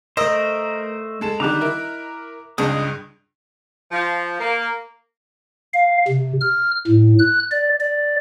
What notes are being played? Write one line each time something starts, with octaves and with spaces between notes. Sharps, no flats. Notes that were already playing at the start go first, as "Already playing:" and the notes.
A3 A#4 C5 D#5 E6
G#3 A4 E7
D3 D#3 G3 A#5 D6 F#6
E4 A#4
C#2 G2 G#3 D#6
F3
A#3
F5
C3
F6
A2
F#6
D5
D5